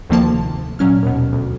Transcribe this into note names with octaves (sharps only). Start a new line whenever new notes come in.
D2 C3 D#3 F3 A#3 A5
A#2 F#3 C#4 F6
D#2 B2
D2